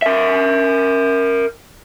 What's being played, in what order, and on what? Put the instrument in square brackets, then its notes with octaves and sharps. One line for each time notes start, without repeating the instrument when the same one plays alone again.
[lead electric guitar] A#4 E5